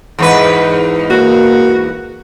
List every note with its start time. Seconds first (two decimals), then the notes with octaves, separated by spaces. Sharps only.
0.19 E2 G#2 B4
1.10 A#3 F#4